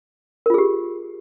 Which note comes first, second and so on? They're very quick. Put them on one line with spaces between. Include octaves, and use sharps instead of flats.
A#4 F4 G#4 G4